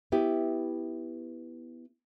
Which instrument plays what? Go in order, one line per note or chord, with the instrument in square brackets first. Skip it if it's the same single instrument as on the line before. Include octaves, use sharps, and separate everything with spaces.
[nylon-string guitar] B3 E4 G4